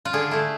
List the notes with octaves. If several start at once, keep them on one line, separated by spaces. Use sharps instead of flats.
F4
D3 G#4
A3 E4